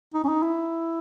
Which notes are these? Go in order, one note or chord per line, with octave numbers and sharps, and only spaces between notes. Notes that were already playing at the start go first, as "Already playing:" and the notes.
D#4
C#4
D#4
E4